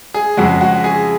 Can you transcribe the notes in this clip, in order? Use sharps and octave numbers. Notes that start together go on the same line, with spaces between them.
G#4
F2 C#3 G#3 F#4
F#4
G#4